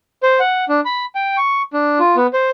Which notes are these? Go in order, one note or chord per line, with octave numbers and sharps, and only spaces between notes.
C5
F#5
D4
B5
G5
C#6
D4
F4
B3
C5